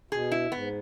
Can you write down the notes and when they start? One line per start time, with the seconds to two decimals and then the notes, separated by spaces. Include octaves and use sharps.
0.11 B2 G#4
0.32 E4
0.52 G#2 B3